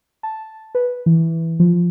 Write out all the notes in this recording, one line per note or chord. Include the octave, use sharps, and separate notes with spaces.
A5
B4
E3
F3